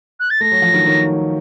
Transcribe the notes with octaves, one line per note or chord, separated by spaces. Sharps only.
F#6
A6
A3 A#6
F#3
F3
D#3 F#3
D#3 F#3